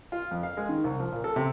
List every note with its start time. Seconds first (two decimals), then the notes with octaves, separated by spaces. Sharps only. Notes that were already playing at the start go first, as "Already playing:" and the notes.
0.12 F4
0.31 F2
0.43 F5
0.57 G#3
0.69 D#3
0.84 C2
1.00 F3
1.12 A#2
1.24 A4
1.36 C3